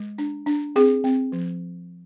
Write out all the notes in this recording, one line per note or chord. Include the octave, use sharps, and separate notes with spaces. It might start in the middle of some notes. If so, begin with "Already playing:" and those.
Already playing: G#3
D4
D4
C4 G#4
C4
F3